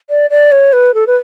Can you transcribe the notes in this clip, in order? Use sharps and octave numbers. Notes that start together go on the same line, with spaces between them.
D5
D5
C#5
B4
A4
B4